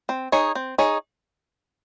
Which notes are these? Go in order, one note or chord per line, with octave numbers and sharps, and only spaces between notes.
C4
D#4 G#4 C#5
C4
D#4 G#4 C#5